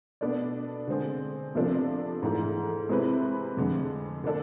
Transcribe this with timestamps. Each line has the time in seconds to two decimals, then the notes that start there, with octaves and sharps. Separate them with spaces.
0.21 B2 B3 D4 A4 D5
0.87 D3 G#3 C4 G#4
1.55 C3 F3 B3 D4 A4
2.23 G#2 E3 A3
2.89 C3 G#3 C4 E4 B4
3.57 F2 D3 G#3
4.24 D3 A3 D4 A4